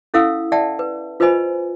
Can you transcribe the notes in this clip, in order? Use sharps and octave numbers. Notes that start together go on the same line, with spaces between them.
C#4 E4 A4 F5 F#5 E6
D5 E5 F#5 G5 A5
B4
F4 B4 C5 D#5 G#5 B5